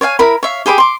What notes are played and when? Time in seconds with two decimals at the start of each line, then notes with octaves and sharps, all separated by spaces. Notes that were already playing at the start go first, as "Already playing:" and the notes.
0.01 C#5 D5 F5 G#5
0.19 E4 A#4 B5
0.43 C#5 E5 F5
0.66 G4 G#4 B5 D6
0.78 C6 D6